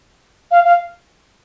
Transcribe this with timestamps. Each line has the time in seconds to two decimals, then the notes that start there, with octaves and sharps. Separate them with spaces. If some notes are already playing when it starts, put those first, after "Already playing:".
0.51 F5
0.65 F5